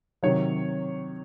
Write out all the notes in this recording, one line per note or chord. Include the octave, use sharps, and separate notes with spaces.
C3 D#3 F#3 C#5